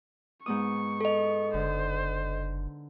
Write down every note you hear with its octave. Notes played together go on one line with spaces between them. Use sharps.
G#2 B3 C#6 D#6
A4 D#5
F#1 D3 C5